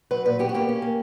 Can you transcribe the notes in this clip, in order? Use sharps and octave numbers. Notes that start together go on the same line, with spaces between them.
F#3 B4
A#2 B4
B3 G4
F#4
A#3 G4
C#4
A#3